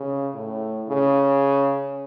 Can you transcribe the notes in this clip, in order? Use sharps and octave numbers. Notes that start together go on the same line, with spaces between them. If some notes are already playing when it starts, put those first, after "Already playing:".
Already playing: C#3
A2
C#3